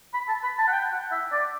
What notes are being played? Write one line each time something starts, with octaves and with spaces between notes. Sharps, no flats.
B5
A5
B5
A5
F#5
G5
F#5
E5
D5